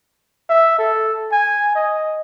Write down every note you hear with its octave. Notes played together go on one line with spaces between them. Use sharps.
E5
A4
G#5
D#5